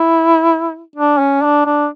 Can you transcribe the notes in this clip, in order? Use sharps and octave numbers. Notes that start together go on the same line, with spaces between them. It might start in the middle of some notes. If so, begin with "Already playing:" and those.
Already playing: E4
D4
C#4
D4
D4